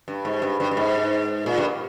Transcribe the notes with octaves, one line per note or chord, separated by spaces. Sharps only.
G2
G#2
G2
G2
G2
G#2
A#2
G2